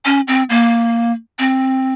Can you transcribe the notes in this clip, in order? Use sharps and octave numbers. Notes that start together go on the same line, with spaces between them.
C#4
C4
A#3
C4